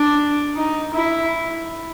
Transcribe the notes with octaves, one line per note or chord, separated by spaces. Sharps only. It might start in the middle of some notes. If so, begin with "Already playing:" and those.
Already playing: D4
D#4
E4